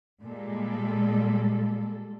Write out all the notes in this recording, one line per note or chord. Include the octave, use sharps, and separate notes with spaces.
A#2 G3 G#3 A4